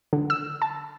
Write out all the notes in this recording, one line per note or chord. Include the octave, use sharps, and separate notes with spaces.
D3
E6
A5